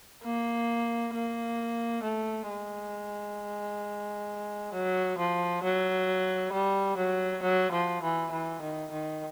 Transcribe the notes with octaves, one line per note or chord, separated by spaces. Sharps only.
A#3
A#3
A3
G#3
F#3
F3
F#3
G3
F#3
F#3
F3
E3
E3
D#3
D#3